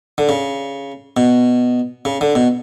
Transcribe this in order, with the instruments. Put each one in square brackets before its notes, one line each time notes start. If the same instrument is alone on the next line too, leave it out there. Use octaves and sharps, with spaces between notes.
[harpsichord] D3
C#3
B2
C#3
D3
B2